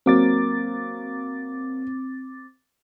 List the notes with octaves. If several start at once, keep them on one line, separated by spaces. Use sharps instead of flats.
F#3 A#3 C4 D6 A6